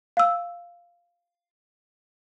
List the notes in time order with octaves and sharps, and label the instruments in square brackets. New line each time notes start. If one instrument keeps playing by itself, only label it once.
[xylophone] F5 E6